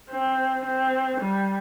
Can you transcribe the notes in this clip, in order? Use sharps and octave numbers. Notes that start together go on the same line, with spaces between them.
C4
C4
G3